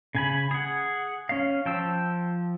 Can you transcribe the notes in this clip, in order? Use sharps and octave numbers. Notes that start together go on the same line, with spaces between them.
C#3 G#5 B5
G#4 F#5
C#4 F5
F3 G5 A5 E6